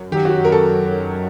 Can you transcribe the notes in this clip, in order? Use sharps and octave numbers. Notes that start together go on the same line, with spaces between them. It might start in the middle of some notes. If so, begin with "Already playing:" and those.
Already playing: F#2
D#3 F#3 G4
F#4
F#2
A#4
A4